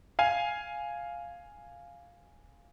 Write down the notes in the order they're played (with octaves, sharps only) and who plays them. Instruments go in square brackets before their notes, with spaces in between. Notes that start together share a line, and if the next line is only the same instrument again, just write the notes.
[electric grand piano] F5 G#5